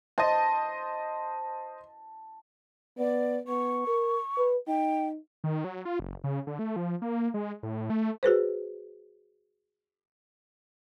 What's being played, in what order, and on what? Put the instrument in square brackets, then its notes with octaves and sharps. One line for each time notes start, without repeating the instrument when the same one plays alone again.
[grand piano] C5 D#5 [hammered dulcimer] A5
[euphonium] B3 [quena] D5
[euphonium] B3 [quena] C#6
[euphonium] A#4
B4
[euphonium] D#4 [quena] G5
[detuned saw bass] D#3
F#3
F4
F#1
C#3
D3
A3
F3
A#3
G#3
A2
A3
[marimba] F#4 G#4 B4 C5